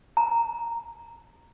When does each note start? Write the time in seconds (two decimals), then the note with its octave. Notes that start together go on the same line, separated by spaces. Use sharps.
0.17 A#5